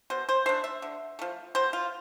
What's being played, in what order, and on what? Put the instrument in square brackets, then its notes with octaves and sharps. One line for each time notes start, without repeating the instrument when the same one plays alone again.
[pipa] B2 C5
C5
A3 D4 C5
E5
D3
F3 A3
B2 C5
F4